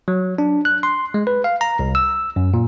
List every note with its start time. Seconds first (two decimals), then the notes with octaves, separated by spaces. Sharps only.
0.08 F#3
0.38 D4
0.65 F#6
0.83 C6
1.14 G#3
1.27 B4
1.44 F5
1.61 A#5
1.79 C2
1.95 E6
2.36 F#2
2.54 A#2